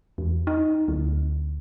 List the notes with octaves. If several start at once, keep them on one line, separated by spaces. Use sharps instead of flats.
E2
D#4
D2